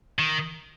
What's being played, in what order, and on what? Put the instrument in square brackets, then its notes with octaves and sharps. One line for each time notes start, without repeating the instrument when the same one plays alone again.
[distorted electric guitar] D#3